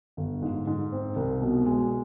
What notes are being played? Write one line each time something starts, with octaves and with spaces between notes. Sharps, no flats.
G1
G#2
G#2
C4
C2
B2
G#3